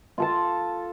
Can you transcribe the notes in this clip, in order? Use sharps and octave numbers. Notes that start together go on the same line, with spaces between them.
F4 A4 A5